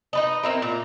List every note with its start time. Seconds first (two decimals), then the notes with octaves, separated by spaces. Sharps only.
0.13 D#4 B4 D#5
0.43 C4 E4 A#4
0.62 A#2 A#5